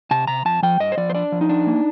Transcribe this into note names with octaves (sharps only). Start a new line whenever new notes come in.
C3 A5
C3 A#5
F2 A5
F3 G5
G2 D#5
C5
F3 D5
C5
D4 D5
F3
D#4
D4
A#3